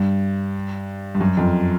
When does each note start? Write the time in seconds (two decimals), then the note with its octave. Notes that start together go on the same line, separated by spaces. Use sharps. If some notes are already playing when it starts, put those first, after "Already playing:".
Already playing: G2
1.15 G2
1.21 F#2
1.37 F2